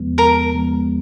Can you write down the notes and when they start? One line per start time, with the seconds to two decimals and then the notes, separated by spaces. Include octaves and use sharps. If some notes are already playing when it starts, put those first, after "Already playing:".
Already playing: E2 C3 F3 G#3 B3
0.18 A#4
0.53 E2 C3 F3 G#3 B3